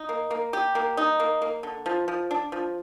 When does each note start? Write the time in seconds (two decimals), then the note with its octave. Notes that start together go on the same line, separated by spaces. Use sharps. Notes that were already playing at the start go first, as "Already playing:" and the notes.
Already playing: D#4
0.09 A#3
0.31 A#3
0.53 G4
0.75 A#3
0.97 D#4
1.20 A#3
1.42 A#3
1.63 D3
1.86 F3
2.08 F3
2.31 D4
2.52 F3